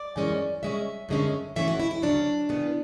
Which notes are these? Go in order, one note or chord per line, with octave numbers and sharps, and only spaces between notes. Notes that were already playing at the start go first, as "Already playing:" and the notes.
Already playing: D5
F#2 E3 G#3 C#4
C#3 G#3 C#4 E5
F#2 D3 G#3 C#4
A2 E3 A3 C#4 E5
F#4
E4
E4
D2 C#3 F#3 C#4 D4
C#3 E3 B3